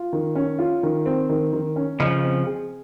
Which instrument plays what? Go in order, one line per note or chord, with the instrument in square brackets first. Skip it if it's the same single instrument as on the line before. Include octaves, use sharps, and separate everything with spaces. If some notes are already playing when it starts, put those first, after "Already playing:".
Already playing: [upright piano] F4
D#3
C#4
F4
D#3
C4
D#3
D#3
C#4
[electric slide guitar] C#3 F3 [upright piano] D#5
[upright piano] C4
G#4